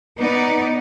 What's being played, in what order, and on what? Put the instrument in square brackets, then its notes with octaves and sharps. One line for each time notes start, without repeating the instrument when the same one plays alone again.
[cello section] B3 D#4 D5